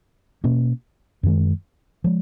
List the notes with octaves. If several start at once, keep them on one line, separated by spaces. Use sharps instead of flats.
B2 A#3 C#4
F#2 D#3 G#3
F3 G#3